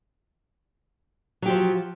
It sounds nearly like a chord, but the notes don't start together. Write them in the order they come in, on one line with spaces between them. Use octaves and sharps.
F#3 G4 F3